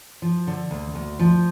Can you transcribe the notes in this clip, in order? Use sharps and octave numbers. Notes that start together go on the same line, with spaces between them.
F3
D3
D2
D2
F3